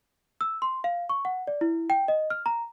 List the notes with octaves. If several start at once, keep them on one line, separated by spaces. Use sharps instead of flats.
E6
C6
F5
C#6
F#5
D5
E4
G5
D#5
F6
A#5